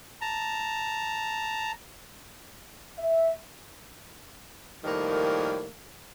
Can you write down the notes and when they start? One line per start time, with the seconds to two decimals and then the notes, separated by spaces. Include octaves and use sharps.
0.21 A5 A#5
2.99 E5
4.84 F2 A2 D#3 G3 A#3